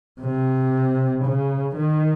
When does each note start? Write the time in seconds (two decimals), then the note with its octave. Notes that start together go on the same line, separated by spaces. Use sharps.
0.22 C3
1.25 C#3
1.76 D#3